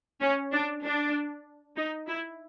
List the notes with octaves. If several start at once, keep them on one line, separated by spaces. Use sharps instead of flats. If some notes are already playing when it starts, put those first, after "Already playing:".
C#4
D4
D4
D#4
E4